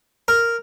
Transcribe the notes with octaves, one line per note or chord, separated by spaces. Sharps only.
A#4